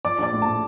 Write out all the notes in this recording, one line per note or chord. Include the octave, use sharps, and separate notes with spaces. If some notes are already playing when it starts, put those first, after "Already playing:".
F3 D5 D6
A#1 D5 D6
A2
A5
A2